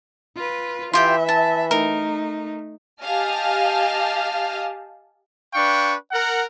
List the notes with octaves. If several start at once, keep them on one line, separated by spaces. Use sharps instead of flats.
F4 B4
E3 F4 G4 E5 G5
A5
A3 D#4 A#4
G4 D#5 F5 G#5 A5 F6
D4 B4 F5 G5 C#6
A#4 F#5